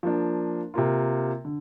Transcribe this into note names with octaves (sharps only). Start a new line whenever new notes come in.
F3 A#3 D4
C3 A#3 F4
D3